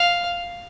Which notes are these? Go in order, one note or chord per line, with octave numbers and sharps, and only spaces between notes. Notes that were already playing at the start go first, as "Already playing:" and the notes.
Already playing: F5